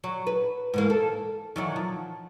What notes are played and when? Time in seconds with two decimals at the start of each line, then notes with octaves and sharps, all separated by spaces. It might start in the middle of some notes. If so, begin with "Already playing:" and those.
0.04 F#3
0.27 B4
0.74 G#2 E3 A#3
0.90 A4
1.56 D#3 E3 F#3
1.76 F3